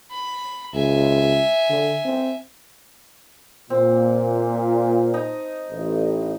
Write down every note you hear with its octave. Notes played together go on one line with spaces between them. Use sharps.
B5
C#2 E5 G#5
D3
C4
A#2 C4
D#4 A#5
A1